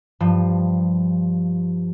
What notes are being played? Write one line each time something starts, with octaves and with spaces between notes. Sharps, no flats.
G2 F3